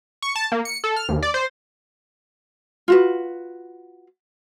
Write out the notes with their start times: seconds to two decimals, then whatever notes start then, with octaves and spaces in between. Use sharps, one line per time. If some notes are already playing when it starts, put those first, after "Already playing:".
0.22 C#6
0.36 A5
0.52 A#3
0.65 C#7
0.84 A4
0.96 F6
1.09 D#2
1.22 D5
1.34 C5
2.88 F4 F#4 B4